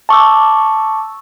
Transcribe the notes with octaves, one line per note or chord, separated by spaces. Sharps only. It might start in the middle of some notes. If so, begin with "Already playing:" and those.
A5 C#6 D6 E6